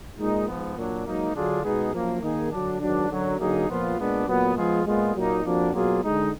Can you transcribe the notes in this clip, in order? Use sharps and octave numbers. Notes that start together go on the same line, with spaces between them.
A#2 G#3 D#4
G#2 F3 B3
A#2 F#3 D4
G#2 F#3 A#3 D#4
D3 F#3 D4 F4 G#4
B2 G#3 B3 D#4 G#4
F#2 F3 A#3
D#3 A#3 D#4 G#4
D3 F#3 D4
G#2 D#3 F#3 D4
F#2 D3 F#3
D3 F#3 A#3 D#4 G#4
A#2 F3 B3 F4
A#2 G#3 B3 D4
A#2 F#3 B3
F3 G#3 B3 F4 G#4
A#2 G#3 B3 F4 G#4
A#2 F#3 A#3 D#4
F2 F3 A#3 D4 F#4
B2 F#3 A#3 F4 G#4
D3 G#3 D#4